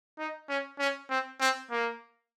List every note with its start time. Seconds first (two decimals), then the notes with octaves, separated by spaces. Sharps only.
0.18 D#4
0.49 C#4
0.79 C#4
1.10 C4
1.40 C4
1.71 A#3